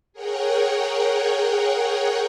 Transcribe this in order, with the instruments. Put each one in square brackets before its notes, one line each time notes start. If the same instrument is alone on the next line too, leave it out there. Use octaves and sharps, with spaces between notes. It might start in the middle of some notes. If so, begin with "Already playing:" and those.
[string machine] G#4 A#4 C#5 F#5 G5